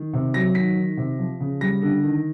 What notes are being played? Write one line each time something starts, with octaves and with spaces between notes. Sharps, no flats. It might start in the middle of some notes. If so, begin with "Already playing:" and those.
Already playing: D#3
C3
F#3 A#6
D#3 B6
D#3
C3
F3
C#3
G3 A#6
D3
D#3